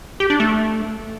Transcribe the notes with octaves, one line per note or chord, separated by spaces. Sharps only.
G4
D4
A3